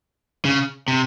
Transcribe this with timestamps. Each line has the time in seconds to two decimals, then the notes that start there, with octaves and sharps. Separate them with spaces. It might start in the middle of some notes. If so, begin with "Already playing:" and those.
0.45 C#3
0.88 C3